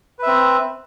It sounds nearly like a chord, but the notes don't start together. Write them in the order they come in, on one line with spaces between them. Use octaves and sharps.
B4 E5 C4